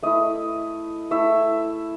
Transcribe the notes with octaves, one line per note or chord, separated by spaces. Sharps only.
A3 E4 D#5
A3 E4 E5